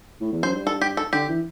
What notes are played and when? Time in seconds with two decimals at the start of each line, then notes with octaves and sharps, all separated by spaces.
0.21 A2
0.32 E2
0.43 F#2 C5
0.55 G2
0.67 A4
0.81 G4
0.97 A4
1.13 D3 G4
1.29 E3